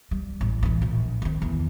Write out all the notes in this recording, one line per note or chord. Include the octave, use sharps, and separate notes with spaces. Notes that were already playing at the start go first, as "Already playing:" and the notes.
G3
A1
E3 G#3
A#1
D#3 C4
E2